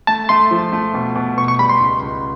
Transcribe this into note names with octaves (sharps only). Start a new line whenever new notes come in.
A3 A5
A3 C6
F3
A3
B2
B2
B3 C#6
C#6
G3 B5
C6
C#2
C#2